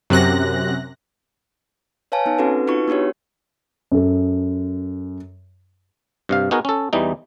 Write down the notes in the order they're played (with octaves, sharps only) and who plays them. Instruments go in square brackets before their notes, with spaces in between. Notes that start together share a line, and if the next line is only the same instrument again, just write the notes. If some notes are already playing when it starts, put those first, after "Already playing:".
[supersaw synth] F#2 C3 F#6 A#6
[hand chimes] B4 C#5 F5 G#5 A5
B3 D#4
C4 C#4 F#4 A4 B4
D#4 F4 F#4 B4 C#6
B3 D4 F#4 G4 C#5
[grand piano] F#2 A4
[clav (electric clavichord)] G2 C3 F5
B3 D#4 F#4 G#4 A#4
C#4 A4
E2 E3 G3 D#4